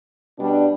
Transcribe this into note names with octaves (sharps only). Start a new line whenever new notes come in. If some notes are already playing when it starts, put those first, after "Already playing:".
B2 G3 D4